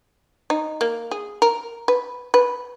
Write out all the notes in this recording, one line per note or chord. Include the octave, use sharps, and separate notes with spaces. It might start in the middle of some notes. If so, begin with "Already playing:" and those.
D#4
A#3
G#4
A#4
B4
B4